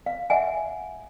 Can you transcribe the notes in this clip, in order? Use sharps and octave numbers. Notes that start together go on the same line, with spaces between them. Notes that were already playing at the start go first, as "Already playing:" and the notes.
F5
E5 F#5 G#5